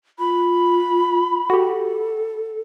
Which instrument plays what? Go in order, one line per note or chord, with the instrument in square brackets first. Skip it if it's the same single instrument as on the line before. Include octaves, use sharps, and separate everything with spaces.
[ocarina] F4 [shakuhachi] B5
[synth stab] F#4 G4 [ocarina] A4